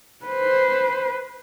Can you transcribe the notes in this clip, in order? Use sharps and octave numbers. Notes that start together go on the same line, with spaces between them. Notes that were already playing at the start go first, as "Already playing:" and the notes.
B4 C5